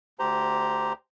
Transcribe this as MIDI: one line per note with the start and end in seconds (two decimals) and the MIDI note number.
0.19 0.93 38
0.19 0.93 67
0.19 0.93 72
0.19 0.93 82